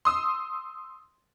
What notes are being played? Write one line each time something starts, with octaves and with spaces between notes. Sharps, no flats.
C6 D#6 E6